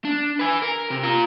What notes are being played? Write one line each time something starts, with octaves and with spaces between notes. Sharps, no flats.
D4
B4 G#5
A#4
C3
F4 A#5